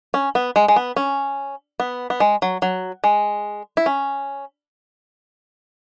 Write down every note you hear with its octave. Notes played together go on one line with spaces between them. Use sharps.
C#4
B3
G#3
G#3
B3
C#4
B3
B3
G#3
F#3
F#3
G#3
E4
C#4